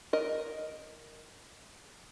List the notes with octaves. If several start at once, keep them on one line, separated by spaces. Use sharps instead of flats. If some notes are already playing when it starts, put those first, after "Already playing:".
A#4 D#5